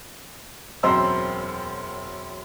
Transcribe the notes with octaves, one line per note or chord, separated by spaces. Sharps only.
E1 F#2 C4 C5 A#5 E6